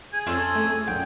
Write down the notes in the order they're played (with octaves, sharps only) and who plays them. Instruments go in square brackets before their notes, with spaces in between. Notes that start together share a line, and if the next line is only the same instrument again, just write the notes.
[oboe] G#4
[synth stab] F2 [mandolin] C4 C#4 A4
[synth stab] A3
[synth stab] B1 F#2 A#2 [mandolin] G5